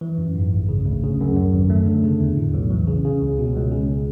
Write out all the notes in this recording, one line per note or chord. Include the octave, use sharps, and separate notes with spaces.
E3
F#2
G#2
A1
C#3
D2
C#3
F#2
F#2
G#1
A3
D3
C#3
E2
A2
B1
E3
C#3
C#3
C#2
B2
C#2
C#3